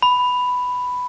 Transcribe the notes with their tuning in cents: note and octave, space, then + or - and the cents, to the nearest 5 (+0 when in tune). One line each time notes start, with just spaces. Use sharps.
B5 +5